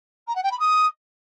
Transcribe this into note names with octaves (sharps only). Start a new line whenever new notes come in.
A#5
F#5
G5
B5
D#6